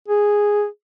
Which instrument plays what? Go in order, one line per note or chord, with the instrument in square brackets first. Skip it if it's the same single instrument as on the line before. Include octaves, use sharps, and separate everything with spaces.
[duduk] G#4